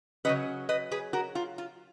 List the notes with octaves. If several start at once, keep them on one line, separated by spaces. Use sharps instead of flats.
C#3 F#3 C#4 B4 D#5
B4 D#5
G#4 B4
F#4 A#4
F4
F4